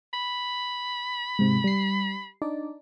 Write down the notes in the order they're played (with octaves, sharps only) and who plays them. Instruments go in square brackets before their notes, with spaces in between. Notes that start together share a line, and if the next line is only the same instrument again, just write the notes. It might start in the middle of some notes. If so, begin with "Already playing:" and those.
[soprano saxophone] B5
[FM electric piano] G#2 C3
G3 C7
D4 D#4 D5